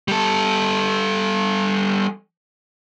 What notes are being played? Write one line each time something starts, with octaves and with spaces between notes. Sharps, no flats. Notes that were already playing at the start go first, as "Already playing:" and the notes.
G3 A4